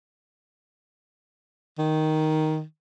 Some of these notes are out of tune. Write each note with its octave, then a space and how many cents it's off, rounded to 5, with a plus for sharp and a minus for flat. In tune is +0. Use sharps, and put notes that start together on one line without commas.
D#3 +5